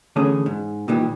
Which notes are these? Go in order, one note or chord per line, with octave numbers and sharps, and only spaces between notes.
D3 E3 A3 C#4 G#4 C#5
G#2
A#2 D#3 E3 G3